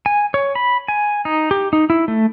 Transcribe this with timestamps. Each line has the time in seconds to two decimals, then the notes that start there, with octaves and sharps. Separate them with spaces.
0.06 G#5
0.34 C#5
0.55 B5
0.88 G#5
1.25 D#4
1.51 G4
1.73 D#4
1.90 E4
2.08 A3